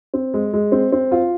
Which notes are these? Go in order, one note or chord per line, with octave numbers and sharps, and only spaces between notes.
C4
G#3
G#3
C4
C4
F4